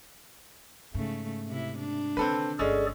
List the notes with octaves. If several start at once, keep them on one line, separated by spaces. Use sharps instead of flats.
G#2 C#3 A3
C3 E4
D4
D3 D#3 C4 A4 B4
G1 G#3 C#4 G#4 A4 D5